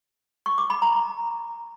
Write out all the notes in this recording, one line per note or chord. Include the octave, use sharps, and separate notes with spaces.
C#6
D6
B5
A#5